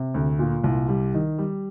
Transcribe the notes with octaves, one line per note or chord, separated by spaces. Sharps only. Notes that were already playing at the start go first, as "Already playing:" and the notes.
Already playing: C3
D2
A#2
C2
G3
D#3
G3